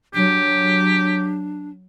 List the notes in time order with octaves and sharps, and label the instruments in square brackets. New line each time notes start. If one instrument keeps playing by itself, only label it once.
[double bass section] F#3 [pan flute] D4 [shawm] G4